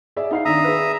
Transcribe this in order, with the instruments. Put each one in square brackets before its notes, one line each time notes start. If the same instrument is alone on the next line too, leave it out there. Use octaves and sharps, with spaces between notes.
[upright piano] G#4 D5 E5
D#4 F5 C7
[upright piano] D#3 D4 [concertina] E5 A#5 D#6
[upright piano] G#4 B4